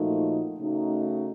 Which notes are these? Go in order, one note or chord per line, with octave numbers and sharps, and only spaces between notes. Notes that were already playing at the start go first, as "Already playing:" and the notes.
Already playing: A#2 F3 A3 D#4 F#4
C#3 A3 D#4 F#4